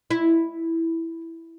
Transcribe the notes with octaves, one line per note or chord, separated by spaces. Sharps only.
E4